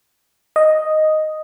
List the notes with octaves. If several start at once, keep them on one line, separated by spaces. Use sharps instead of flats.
D#5